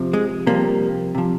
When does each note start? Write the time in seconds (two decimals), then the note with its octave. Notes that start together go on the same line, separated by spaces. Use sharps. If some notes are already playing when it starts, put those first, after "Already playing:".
Already playing: C3 F3
0.13 G#3
0.47 C3 F3 G3 A#3
1.15 C3 F3